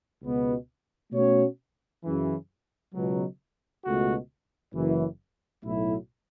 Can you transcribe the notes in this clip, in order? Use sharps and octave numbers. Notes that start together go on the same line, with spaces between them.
C#2 B2 B3
B2 A3 C#4 F#4 C#5
F#2 C#3 E3
C#2 B2 F#3
C#2 B2 A3 F#4
F#1 F#2 E3
B1 A2 F#3 A3 E4